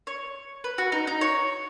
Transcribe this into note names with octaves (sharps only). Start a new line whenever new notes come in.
C#5
B4
F#4
D#4
D#4
C#5